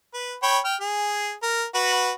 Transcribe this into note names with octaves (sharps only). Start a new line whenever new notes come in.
B4
C#5 G5 B5
G5 F6
G#4
A#4
F#4 B4